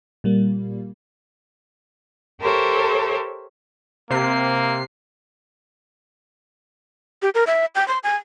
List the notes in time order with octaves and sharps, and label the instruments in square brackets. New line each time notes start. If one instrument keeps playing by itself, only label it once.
[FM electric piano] A#2 G3 A#3
[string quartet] G4 A4 A#4 C5 C#5 E5
[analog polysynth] C3 C7 [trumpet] A#3
[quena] G4
A#4
E5
G5
C6
G#5